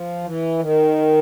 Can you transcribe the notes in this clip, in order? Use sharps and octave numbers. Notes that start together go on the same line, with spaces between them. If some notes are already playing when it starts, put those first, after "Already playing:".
Already playing: F3
E3
D#3